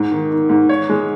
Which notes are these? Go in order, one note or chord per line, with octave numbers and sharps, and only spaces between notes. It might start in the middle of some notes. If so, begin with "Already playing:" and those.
Already playing: G#2
D#3
D#3
G#2
C#5
G#3